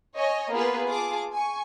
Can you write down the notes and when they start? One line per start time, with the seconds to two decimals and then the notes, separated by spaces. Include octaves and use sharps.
0.16 C#5 D#5 G#5
0.52 A#3 B3 F4 G#4 B4
0.87 F4 G#4 A5 D6
1.33 G#5 C#6